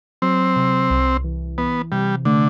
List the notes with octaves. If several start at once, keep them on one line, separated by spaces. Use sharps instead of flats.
F#3 C4
C3
C2
E3
E3 B3
C3 G3
D3 A3